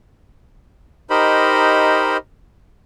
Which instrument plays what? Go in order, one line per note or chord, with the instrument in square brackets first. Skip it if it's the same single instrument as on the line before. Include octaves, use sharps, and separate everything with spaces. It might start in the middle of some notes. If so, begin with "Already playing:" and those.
[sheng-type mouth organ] D#4 G4 A#4 C5 D#5 B5